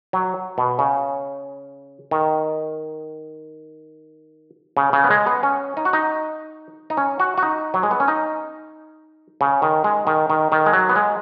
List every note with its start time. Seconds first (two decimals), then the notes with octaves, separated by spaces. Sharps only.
0.13 F#3
0.58 B2
0.79 C#3
2.11 D#3
4.77 C#3
4.93 C#3
5.04 B3
5.10 G#3
5.27 B3
5.43 C#4
5.77 D#4
5.85 F#4
5.93 D#4
6.90 D#4
6.97 C#4
7.20 F#4
7.38 F#4
7.43 D#4
7.74 F#3
7.83 G#3
7.91 B3
8.00 C#4
8.08 D#4
9.41 C#3
9.62 D#3
9.84 G#3
10.07 D#3
10.30 D#3
10.52 D#3
10.66 G#3
10.73 F#3
10.89 B3
10.96 G#3